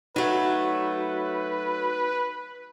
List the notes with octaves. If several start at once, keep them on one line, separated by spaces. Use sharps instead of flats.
F#3 A3 D#4 F#4 B4 F#5